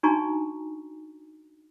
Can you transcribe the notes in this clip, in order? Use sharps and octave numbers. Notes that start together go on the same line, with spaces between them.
D4 D#4 F#4 G#5 A#5 C#6